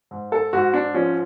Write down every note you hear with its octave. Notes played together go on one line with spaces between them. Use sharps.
G#2
A4
G#2 F#4
D4
F3 C#4